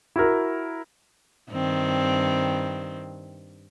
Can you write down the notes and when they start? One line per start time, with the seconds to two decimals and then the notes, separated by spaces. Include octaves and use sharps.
0.16 E4 F#4 A#4
1.51 G2 D#3 C4